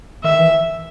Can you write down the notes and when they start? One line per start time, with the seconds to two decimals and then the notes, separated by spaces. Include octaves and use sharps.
0.24 D#3 E5
0.39 E3